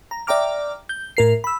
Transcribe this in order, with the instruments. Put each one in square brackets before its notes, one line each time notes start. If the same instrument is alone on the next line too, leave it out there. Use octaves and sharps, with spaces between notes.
[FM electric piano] A#5
D5 E5 G5 A#5 D6 F6
G6
A2 A#4 C7
B5 E6